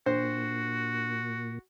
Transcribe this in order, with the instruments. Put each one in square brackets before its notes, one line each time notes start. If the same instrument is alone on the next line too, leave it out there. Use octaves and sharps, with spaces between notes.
[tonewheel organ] A#2 [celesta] D4 [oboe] F#4 [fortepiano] C5